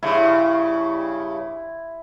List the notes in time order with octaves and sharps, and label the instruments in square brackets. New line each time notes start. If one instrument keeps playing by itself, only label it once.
[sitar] G2 C#3 [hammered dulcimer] E4 C6